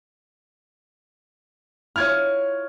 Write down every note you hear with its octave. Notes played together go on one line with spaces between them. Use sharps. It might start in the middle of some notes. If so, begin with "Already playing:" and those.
E4 F4 C#5 F6 G#6